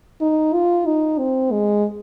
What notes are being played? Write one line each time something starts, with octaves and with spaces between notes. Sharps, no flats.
D#4
F4
D#4
C4
G#3